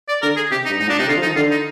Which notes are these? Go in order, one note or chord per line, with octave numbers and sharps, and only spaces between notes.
D5
D3 A#4
G#4
C3 G4
D#4
G2
G#2 D#4
A#2 D4
C3 D#4
D3 F4
F3
D#4
D#3
D3 F4
D#4